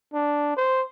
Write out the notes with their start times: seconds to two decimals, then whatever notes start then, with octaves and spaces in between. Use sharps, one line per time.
0.13 D4
0.57 C5